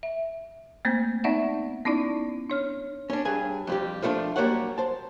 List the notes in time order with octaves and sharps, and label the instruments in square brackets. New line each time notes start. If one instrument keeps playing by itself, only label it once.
[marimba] E5
A3 A#3 C4 C5 G6
B3 C4 D#4 D5 E5 F#5
B3 C#4 D#4 E4 D5
D4 C#5 F6
[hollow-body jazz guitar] C#4 D4
G2 G#4 G#5
F2 G3 G4
F3 A3 B3 D4 F4
F#2 G3 A#3 G4 C#5 F#5
C5 A5